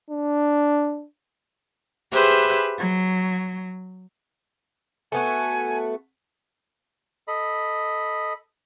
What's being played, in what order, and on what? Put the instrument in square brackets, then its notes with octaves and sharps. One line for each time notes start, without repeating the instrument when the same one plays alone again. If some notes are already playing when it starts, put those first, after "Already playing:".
[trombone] D4
[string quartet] G4 G#4 B4 C5 E5
F#3
[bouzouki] A3 B3 F#4 [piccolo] G#5
[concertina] A4 D#5 B5